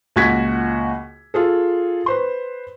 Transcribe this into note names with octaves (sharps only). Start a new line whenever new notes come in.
C#2 A#2 F#4 F#5 G#6 B6
F4 G#4 A4
B4 C5 C6